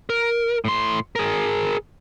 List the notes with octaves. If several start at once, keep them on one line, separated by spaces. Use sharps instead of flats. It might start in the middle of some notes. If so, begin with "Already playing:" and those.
A#4
A2 C6
G#4 A#4